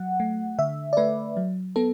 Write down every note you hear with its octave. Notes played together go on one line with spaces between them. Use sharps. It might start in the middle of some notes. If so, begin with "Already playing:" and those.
Already playing: F#3 F#5
A3
D3 E5
D5
A3 B4
F#3
B3 A4